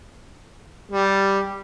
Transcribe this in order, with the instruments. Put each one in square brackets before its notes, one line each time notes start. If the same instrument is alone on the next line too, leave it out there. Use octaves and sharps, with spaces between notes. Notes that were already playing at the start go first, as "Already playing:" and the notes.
[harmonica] G3